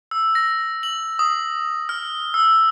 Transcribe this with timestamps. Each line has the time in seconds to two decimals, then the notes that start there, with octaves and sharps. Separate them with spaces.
0.11 E6
0.35 A#6
0.83 F#7
1.19 D#6
1.89 F6
2.34 E6